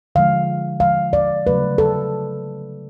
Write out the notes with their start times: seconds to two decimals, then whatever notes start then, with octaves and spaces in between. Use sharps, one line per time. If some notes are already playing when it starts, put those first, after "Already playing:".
0.15 D3 F3 G#3 F5
0.80 D3 F3 G#3 F5
1.13 D5
1.46 C#3 F#3 A3 B4
1.78 A4